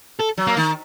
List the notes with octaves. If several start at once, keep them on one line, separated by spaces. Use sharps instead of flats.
A4
F#3
A#3
D#3